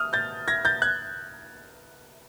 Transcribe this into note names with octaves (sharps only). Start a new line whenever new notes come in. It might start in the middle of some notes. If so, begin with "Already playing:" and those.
Already playing: D#6 F6
G6 A6
G#6 A#6
G6 A6
F#6 G#6